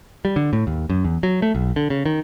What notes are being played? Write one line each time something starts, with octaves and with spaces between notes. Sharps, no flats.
G3
D3
A2
D#2
F#2
E2
F#3
A3
B1
D3
C#3
D#3